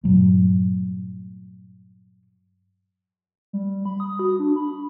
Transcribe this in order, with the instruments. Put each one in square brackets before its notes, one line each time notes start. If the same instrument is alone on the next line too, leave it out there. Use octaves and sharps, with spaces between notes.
[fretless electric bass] G2 A#2 F#3 A3
[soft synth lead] G3
B5
D#6
F#4
D4
B5